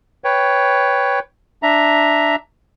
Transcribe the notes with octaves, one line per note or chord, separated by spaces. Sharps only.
B4 C#5 G5
D4 E5 A#5